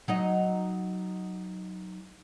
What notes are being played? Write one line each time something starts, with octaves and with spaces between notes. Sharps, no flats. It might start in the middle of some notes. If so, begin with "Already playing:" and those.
F#3 D#4 D#5